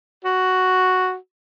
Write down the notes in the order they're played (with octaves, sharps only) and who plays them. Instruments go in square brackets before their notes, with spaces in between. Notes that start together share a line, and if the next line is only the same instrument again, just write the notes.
[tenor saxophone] F#4